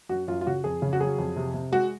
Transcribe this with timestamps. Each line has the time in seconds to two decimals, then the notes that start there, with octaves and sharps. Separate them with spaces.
0.09 F#2 F#4
0.28 F#2 F4
0.41 F4
0.47 C#3 F#4
0.64 F2 G#4
0.82 C#3
0.93 F#4
1.00 F#3 G#4
1.18 F2
1.36 C3
1.54 C3
1.72 G#3 F#4